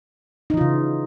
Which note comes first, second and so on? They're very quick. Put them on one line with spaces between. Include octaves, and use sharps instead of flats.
D#4 E3 F4 C#3